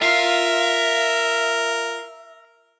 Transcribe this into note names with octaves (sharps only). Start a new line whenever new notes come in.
F4 A#4 E5 F5